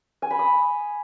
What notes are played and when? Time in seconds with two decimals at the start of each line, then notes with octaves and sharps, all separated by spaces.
0.22 G#5
0.31 B5
0.39 D#6